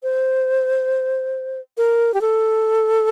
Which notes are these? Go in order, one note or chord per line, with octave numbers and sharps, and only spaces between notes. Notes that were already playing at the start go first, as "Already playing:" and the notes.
C5
A#4
G4
A4